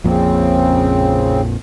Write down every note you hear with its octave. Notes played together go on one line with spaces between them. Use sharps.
A#1 F2 A#2 C#3 C4